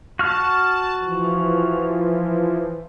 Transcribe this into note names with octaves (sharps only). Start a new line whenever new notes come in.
F#4 A5 F6
E3 F3